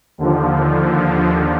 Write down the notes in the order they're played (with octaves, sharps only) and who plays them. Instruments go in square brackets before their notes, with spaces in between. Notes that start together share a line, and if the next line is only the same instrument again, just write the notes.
[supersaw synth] D#2 D3 F3